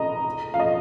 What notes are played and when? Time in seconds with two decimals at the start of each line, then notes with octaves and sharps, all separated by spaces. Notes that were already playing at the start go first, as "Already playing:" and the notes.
Already playing: D#5 A#5
0.54 F5
0.60 D#5